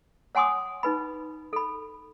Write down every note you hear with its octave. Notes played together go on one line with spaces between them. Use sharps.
C#5 F#5 G#5 C6 D6 D#6
D#4 B4 B5
A4 B5